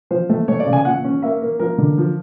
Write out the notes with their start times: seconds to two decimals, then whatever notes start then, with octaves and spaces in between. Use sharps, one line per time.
0.11 F3 C5
0.29 A3
0.48 A3 C#5
0.60 D5
0.66 C#3
0.73 G#5
0.85 A#2 F#5
1.04 C#4
1.22 A#3 E5
1.42 A#3
1.59 F3 A#4
1.78 D3
1.98 F3